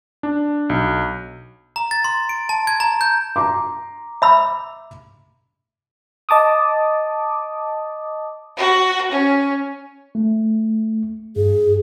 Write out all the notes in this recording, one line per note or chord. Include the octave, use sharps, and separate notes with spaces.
D4
B1
A#5
A6
C6
D7
A5
G#6
A#5
G6
A#5 C6 D6
E5 B5 E6
D#5 A5 D6 D#6
F#4
C#4
A3
G2 G#4